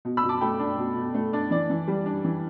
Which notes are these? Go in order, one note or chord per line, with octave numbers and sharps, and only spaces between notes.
B2
B5 E6
B2
A5 D6
A3 G5 B5
D4
B2
B2
A3
D4 D5
E3 D5
E3
G3
D4
E3